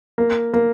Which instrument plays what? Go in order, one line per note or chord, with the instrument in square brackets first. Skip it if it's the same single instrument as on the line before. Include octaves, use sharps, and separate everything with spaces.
[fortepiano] A#3
A#3